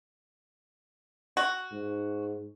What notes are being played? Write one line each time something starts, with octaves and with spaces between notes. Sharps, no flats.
F#4
G#2